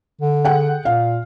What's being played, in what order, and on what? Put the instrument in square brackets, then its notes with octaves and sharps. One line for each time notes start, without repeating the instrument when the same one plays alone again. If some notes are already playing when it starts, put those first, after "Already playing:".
[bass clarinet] D3
[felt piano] G#4 F#5 G5
[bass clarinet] A#2 [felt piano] F5